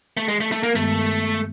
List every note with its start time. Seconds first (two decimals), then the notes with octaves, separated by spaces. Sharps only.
0.17 A3
0.28 G#3
0.40 A3
0.52 A3
0.63 A#3
0.74 G2 D#3 G#3 A3 B3